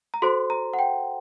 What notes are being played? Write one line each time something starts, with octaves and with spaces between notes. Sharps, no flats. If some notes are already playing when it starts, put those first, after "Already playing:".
A#5
F#4 A4 C5 C6
A#5
F#5
G5